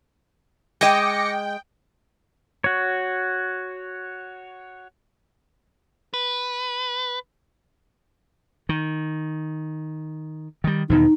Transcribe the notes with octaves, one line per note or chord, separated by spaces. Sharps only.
G#3 D#5 G5 D6 A#6 C#7
F#4 C#5
B4
D#3
D#3 G3
E2 B2 D#3 D#4